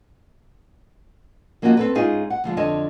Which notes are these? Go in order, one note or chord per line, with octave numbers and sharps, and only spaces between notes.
F3 A#3 C#4 F4 F#4 D#5
C4 A4 B4
G#2 C#4 D#4 F4 G#4
F#5
D2 F3 G#3
F2 D3 C#5 D#5 A5